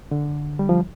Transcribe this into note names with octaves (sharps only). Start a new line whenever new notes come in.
D3
G3
F3